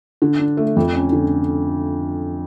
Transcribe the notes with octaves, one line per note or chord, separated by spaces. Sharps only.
D3
D4
A3
F2
C#4
D3